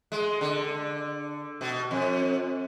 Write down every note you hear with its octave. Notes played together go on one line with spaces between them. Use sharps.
G#3
D3
B2
F2